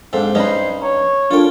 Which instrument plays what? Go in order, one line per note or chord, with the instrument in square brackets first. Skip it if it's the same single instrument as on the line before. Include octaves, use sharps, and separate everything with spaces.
[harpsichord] G#2 C4 [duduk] D4 [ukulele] A4 F5
[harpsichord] G2 C#4 D#4 [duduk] C5 [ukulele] D#5 B5
[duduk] C#5 [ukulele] A#5
[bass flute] D4 [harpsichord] F4 G5 [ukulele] A4 A#4 D5